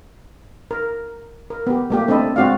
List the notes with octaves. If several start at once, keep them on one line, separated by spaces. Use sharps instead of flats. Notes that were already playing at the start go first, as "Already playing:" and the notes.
A#4
A#4
B3 G4
A3 A#3 G4
A3 C4 D4 A4 D#5 B5
G#3 C4 F#4 D5 F5